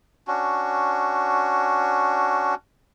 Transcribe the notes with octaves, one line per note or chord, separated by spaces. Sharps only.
C#4 D4 F#4